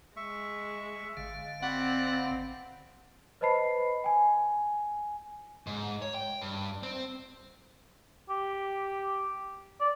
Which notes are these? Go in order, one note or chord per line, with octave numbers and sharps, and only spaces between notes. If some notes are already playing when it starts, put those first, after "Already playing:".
G#3 E5 C#6
G#1 D3 F5
C4 D5 F#5 B5
B4 C5 D#5 A5 B5 C7
G5 G#5
G#2
C#5
G5
G2
C4
G4
D5